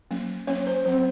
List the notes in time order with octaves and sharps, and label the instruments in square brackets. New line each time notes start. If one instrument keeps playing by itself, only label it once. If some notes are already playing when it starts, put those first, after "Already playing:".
[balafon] F#3 A#3 C#4
F#3 A#3 C#4 C#5
C5
F#3 C4 C5